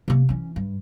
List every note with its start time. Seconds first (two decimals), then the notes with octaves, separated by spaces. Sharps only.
0.08 C3 A#3
0.29 E3 C#4
0.56 G2